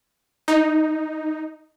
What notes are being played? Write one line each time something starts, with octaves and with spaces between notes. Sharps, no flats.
D#4